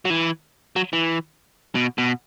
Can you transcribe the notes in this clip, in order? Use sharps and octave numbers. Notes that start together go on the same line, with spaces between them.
F#3
E3
F#3
E3
B2
B2